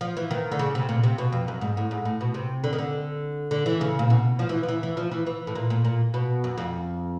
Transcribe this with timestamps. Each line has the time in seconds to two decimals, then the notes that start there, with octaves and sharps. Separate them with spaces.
0.01 F3
0.17 E3
0.31 D#3
0.52 D3
0.59 C#3
0.75 C3
0.89 A#2
1.03 C3
1.18 B2
1.32 F2
1.48 F#2
1.61 G#2
1.77 A2
1.91 G#2
2.05 A2
2.21 B2
2.34 C3
2.64 D3
2.73 D#3
2.78 D3
3.51 D3
3.66 E3
3.81 C#3
3.99 A#2
4.10 B2
4.39 F3
4.49 E3
4.63 F3
4.68 E3
4.83 E3
4.97 F3
5.12 E3
5.26 E3
5.47 A2
5.55 A#2
5.70 A#2
5.85 A#2
6.14 B2
6.44 F#2
6.58 F2